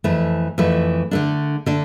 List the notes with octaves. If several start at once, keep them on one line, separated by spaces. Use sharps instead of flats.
F2 E3 A3
F2 E3 A3
D3 A3 D4
D3 A3 D4